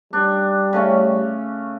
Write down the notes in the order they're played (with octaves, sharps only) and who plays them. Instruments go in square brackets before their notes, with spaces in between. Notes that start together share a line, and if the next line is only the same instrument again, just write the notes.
[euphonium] G3 [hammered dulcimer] D4
[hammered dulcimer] C#3 A3 C#4